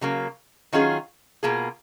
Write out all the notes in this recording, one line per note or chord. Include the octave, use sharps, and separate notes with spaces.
C#3 F#3 A#3
D#3 F#3 C#4 F4 G#4
B2 A#3 F4 G#4